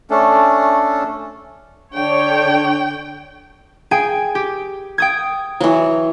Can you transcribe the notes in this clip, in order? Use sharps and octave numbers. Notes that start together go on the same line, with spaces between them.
A3 C#4 D4 A4
D3 D4 C#5 G5
G#4 G5 G#5
G4
G5 D#6 G#6
E3 F#3